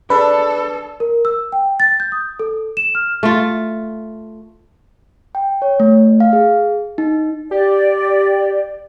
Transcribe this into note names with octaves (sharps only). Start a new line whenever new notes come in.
D4 G#4 A4 B4
A#4
E6
G5
A6
G6
D#6
A4
E7
F6
A3 F4
G5
C#5
A3
F5
G#4
D#4
G4 D5